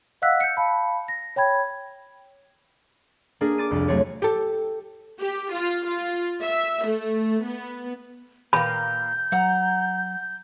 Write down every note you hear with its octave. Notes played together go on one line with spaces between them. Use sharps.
D#5 F5 F#5 E6 F#6 B6
G6 C#7
F5 A5 B5
A#6
C#5 G5 B5 G#6
A#3 D4 G#4
D6 A6 D#7
C2 F2
F#3 A3 C4 D4 C#5
G4 A4
G4
F4
F4
E5
A3
B3
A#2 A#3 B4 G5 B5 G6
F#3 F#5 A#5